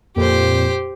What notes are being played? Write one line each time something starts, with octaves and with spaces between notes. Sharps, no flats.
F2 A#2 G4 C5